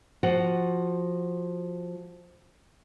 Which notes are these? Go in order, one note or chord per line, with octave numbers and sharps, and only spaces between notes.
F3 F#4 F#5